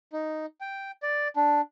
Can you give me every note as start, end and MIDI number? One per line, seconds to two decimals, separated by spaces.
0.13 0.46 63
0.61 0.91 79
1.03 1.28 74
1.36 1.61 62